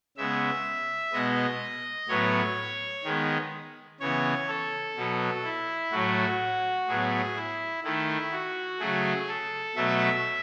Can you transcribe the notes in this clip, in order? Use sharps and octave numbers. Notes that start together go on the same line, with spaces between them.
C#3 G#3 B3 E5
B2 G#3 B3 D#5
A2 F#3 B3 C#5
D#3 G#3 B3
C#3 E3 B3 C#5
A4
B2 F#3 B3
E4
A2 F#3 A3 F#4
A2 F#3 B3 G#4
E4
D#3 A3 E4
F#4
C#3 F#3 A3 G#4
A4
B2 F#3 A3 E5